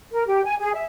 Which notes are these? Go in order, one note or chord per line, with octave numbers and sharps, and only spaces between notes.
A#4
G4
G#5
G#4
E5